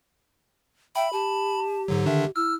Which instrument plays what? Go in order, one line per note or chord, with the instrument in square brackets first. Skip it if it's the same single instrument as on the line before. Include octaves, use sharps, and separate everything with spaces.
[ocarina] E5 [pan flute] G5 [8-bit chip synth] B5
[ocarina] G4 [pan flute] A5
[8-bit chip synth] G#2 D3 F#3
[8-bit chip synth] D3 D#3 D4 [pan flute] E5
[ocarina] E4 [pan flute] E6 [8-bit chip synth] F6